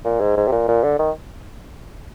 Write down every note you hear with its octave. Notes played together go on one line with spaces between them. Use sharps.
A#2
G#2
G#2
C3
A#2
A#2
D3
D#3